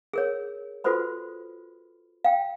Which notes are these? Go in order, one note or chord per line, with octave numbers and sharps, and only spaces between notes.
G#4 A#4 C#5
F4 F#4 A4 B4 C5 B5
F5 G5